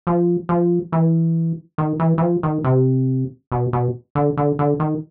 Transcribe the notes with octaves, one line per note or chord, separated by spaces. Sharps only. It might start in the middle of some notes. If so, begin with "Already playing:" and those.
F3
F3
E3
D#3
E3
E3
F3
D#3
C3
B2
B2
D3
D3
D3
D#3